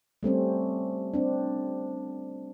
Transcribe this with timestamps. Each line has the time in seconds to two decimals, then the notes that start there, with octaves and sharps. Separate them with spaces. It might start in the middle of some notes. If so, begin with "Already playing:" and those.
0.23 G3 A3 C4 C#4
1.14 C4 D4